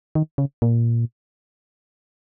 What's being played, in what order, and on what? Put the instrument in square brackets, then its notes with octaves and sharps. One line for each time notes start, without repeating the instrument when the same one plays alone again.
[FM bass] D#3
C#3
A#2